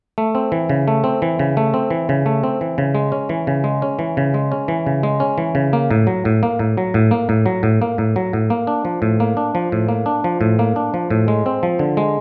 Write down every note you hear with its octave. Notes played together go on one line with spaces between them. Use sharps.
A3
C4
E3
C#3
A3
C4
E3
C#3
A3
C4
E3
C#3
A3
C4
E3
C#3
G#3
C#4
E3
C#3
G#3
C#4
E3
C#3
G#3
C#4
E3
C#3
G#3
C#4
E3
C#3
A#3
A2
F#3
A2
A#3
A2
F#3
A2
A#3
A2
F#3
A2
A#3
A2
F#3
A2
A#3
D4
F3
A2
A#3
D4
F3
A2
A#3
D4
F3
A2
A#3
D4
F3
A2
G#3
C4
F3
D3
G#3